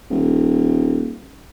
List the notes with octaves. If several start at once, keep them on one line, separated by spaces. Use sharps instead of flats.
D#1